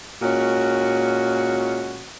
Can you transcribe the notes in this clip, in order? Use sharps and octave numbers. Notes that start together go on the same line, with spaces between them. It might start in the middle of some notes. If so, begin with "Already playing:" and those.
A#2 G#3 C#4 F#4